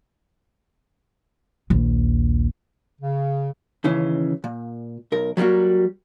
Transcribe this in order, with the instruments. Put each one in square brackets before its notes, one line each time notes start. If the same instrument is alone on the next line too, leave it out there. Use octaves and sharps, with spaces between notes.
[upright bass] A#1 D#2
[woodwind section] C#3
[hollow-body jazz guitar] D#2 C#3 E3 C#4
A#2
B1 A#4
F#3 G3 A3 A#3 F#4